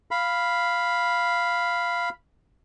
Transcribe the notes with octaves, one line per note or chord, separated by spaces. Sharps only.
F5 B5